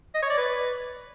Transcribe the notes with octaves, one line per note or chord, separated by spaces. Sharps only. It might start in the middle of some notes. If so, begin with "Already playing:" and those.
D#5
C#5
D5
B4